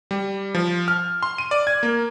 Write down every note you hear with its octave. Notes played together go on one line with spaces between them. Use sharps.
G3
F3
F6
C6
D#7
D5
G#6
A#3